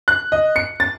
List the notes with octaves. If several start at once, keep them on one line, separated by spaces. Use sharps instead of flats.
F#6
D#5
C#7
A6